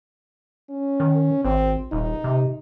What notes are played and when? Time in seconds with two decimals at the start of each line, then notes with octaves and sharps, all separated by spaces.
0.70 C#4
1.00 D#3
1.45 G#1 C4
1.92 D#1 D#4
2.24 C3